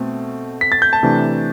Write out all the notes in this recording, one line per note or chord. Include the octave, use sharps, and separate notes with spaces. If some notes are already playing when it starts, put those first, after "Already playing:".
Already playing: B2 A3 C4
B6
A6
G6
A5
C3 E3 A3 D4